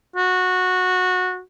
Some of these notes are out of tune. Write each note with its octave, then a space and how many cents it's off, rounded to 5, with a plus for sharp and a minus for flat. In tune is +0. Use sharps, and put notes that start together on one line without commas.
F#4 -15